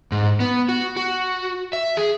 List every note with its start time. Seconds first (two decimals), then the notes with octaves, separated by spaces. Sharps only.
0.12 G#2
0.40 B3
0.69 F#4
0.96 F#4
1.73 E5
1.97 G#4